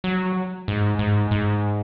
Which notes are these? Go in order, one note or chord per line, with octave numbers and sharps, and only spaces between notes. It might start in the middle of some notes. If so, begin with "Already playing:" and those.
F#3
G#2
G#2
G#2